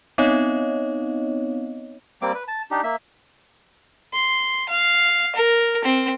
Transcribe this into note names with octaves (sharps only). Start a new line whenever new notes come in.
B3 C4 D#4 C#5 D#5 F5
G3 A#3 C4 D6
B4
A5
D4 D#4 G4
A#3 E5
C6
F5
A#4
C4